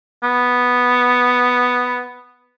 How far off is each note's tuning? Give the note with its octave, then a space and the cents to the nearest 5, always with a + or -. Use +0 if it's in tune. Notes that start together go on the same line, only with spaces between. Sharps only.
B3 +0